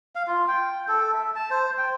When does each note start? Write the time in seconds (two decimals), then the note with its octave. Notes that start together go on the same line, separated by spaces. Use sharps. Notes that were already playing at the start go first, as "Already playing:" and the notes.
0.15 F5
0.27 F4
0.48 G5
0.88 A4
1.14 E5
1.35 A5
1.51 C5
1.78 G5